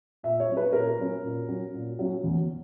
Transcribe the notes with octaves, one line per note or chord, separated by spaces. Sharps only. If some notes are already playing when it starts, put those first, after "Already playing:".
A#2 E5
C#5
F#3 C#4
B4
A#2 A#4
F#3 C#4
A#2
F#3 C#4
A#2
F#3 C#4
E2